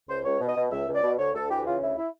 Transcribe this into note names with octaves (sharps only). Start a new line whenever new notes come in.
C#2 C5
C#2 C#5
B2
D#5
B2
C#2 E5
C#2
D5
B2
D2 C#5
D2 A4
E3 G4
C#3 F4
D2 E4
E4